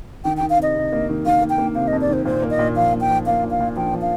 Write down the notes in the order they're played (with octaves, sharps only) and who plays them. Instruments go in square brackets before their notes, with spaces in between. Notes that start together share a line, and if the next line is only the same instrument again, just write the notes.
[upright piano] D#3 [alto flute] G5
[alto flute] G5
[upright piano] D#3
[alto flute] F5
[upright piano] C3 [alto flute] D#5
[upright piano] C3
A#3
D#3
[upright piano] D#3 [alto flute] F5
[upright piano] A#3
[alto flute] G5
[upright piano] A#3
[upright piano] C3 [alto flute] F5
[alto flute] D#5
[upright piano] F2
[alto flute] D5
[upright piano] D#3 [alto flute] C5
[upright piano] A#2 [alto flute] C5
[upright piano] A#3
[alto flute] D#5
[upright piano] A#2
[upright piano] F3 [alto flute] F5
[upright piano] A#2
[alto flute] G5
[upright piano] F3
[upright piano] A#3 [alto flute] F5
[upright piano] A#2
[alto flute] F5
[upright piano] A#2
[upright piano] F3 [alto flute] G5
[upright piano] F3
[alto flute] F5